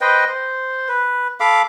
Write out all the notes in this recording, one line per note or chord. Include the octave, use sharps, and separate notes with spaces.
B4 C5 D#5 G5
C5
B4
A4 F5 B5 D6